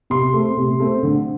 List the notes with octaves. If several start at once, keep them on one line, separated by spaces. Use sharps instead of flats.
C3 C6
A3 C4
C3
A3 C4
D3